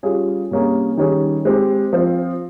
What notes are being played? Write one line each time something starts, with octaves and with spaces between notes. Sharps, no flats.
G3 C#4 F4 G#4
C3 G3 A#3 C#4 G#4
D#3 G3 C#4 G#4
G#3 C4 G4
F3 C4 F4